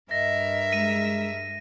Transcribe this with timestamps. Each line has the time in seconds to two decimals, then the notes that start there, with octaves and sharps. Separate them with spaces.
0.11 G2 A#4 D#5 E5 A#6
0.73 G#3 D#7